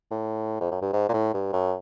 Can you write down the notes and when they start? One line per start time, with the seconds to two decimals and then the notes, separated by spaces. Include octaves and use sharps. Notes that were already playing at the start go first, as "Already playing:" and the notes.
0.11 A2
0.60 F2
0.72 F#2
0.82 G2
0.93 G#2
1.09 A#2
1.14 A2
1.34 G2
1.53 F#2